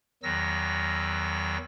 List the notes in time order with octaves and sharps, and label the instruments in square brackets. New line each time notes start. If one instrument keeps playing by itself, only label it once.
[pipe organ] E2 D#3 F#3 E6 A#6